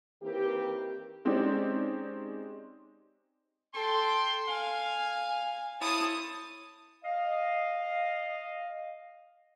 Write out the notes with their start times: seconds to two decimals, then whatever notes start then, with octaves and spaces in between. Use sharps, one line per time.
0.22 D#3 E3 A#3 C4 G4
1.25 G#3 C4 C#4 D#4 G4 D5
3.74 A4 G5 C6
4.48 F5 G#5
5.81 E4 C5 C#5 A5 D#6
7.03 D#5 F5